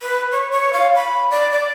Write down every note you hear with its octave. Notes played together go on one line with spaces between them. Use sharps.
B4
C#5
C#5
F5
B5
D5
D5